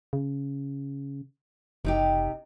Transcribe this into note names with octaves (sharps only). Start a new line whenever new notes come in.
C#3
F#1 C3 D#4 G4